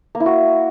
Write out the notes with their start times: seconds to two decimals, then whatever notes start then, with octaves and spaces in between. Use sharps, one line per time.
0.15 A#3
0.20 E4
0.26 F#4